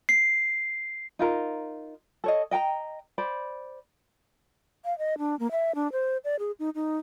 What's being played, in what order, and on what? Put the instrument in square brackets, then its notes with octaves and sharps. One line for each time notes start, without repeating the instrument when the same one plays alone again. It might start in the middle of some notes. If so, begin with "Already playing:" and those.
[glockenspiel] C7
[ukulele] D#4 F4 A#4
A4 C#5 D#5
D#5 G5 G#5 A#5
C5 D5 B5
[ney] F5
D#5
D4
A#3
E5
D4
C5
D5
G#4
D#4
D#4